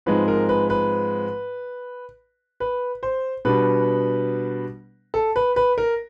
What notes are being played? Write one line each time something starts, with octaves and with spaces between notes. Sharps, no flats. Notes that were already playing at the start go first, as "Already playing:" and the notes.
G#2 F3 G#3 C4 B4
A#4
B4
B4
B4
C5
B2 G3 B3 D4 B4
A4
B4
B4
A#4